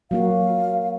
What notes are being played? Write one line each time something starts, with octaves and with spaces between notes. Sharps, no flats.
F#3 A#3 F#4 F5